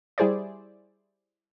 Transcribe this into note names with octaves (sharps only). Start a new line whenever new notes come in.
G3 E4 G#4 C5 D5